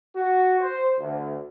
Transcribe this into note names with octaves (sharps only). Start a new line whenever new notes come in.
F#4
C5
D2